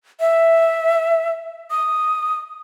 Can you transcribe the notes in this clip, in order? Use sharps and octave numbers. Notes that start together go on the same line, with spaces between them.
E5
D#6